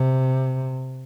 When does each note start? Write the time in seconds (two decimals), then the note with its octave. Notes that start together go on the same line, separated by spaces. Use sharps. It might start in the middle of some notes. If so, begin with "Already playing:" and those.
Already playing: C3